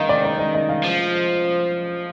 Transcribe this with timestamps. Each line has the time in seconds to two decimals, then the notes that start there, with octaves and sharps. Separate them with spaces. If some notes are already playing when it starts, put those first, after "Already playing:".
Already playing: D#3 D#5 F5
0.09 D5
0.24 D5
0.39 D#5
0.54 D#5
0.69 F5
0.84 F3